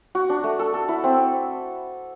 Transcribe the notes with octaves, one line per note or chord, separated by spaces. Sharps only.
F#4
D4
A3
A4
A4
E4
C4